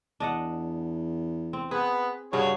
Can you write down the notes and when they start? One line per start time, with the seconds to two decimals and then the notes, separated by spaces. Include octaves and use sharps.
0.20 E2 D4 D#5 F#5
1.53 C4
1.71 B3 G#4 B4
2.33 G2 C#3 F#4 G#4 C#5